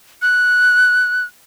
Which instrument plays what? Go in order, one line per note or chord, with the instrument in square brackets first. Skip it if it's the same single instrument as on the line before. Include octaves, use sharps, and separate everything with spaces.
[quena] F#6